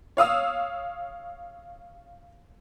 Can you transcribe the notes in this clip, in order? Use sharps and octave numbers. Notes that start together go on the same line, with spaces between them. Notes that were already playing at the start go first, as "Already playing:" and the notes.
C#5 F5 D#6 E6